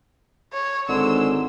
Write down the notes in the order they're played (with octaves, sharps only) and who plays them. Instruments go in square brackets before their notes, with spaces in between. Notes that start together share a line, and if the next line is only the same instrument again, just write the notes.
[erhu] C#5
[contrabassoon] G#1 [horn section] G#2 D3 C6 [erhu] E6